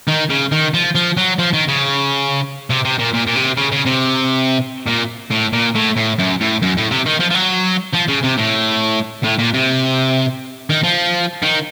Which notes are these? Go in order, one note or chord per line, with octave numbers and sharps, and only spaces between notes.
D#3
C#3
D#3
F3
F3
F#3
F3
D#3
C#3
C3
C3
A#2
A#2
A#2
C3
C#3
C#3
C3
A#2
A2
A#2
A2
A2
F#2
A2
F#2
A2
C3
D#3
F3
F3
F#3
F3
C#3
C3
A2
A2
A#2
C3
D#3
F3
D#3